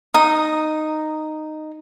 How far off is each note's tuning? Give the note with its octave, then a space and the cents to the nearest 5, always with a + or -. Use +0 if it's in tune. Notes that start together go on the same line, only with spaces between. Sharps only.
D#4 -10 D#6 +0